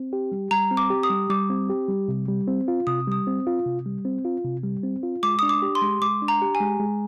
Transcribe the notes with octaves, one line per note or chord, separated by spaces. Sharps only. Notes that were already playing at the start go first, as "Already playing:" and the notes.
Already playing: C4
G4
G3
G3 A#5
C4
D6
G4
D#6
G3
G3 D6
C4
G4
G3
C3
G3
C4
F4
C3 D#6
G3 D#6
C4
F4
C3
G3
C4
F4
C3
G3
C4
F4
G#3 D6
D4 D#6
D6
G4
C6
G#3
G#3 D6
D4
A#5
G4
G#5
G#3
G#3